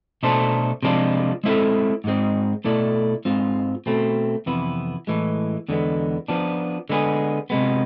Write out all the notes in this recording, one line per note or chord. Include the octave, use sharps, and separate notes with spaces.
B2 A3 D4 A4 C5
C3 F3 G#3 D4 F4
G#3 C4 E4 A4 E5
G#2 G#3 C4
B2 A3 E4 A4 D5
G#2 G#3 C4 F4
B2 A3 C4
F2 C3 E3 B3 E4
A2 E3 G#3
E2 D3 G#3 B3
F3 B3 D4
D3 G#3 B3 E4 G#4
C3 G#3 B3